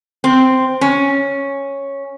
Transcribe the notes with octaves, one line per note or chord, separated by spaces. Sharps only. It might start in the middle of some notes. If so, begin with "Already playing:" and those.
C4
C#4